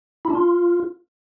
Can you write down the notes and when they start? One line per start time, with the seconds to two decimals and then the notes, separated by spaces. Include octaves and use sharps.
0.25 E4
0.30 D4
0.35 F4